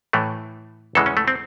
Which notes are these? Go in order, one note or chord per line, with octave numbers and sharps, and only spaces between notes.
A2 E3 A3
E2 C#3 E3 G#3 A4
C#4
A3
C4